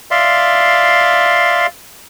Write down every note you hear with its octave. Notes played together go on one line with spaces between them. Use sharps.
D5 E5 F5 C6